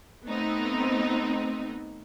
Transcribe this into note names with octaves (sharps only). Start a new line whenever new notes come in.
A3 B3 C4 D#4